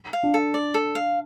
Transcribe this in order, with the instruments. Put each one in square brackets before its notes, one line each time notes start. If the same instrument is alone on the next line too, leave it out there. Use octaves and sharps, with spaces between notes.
[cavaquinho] F5
[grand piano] D4
[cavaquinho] A4
D5
A4
F5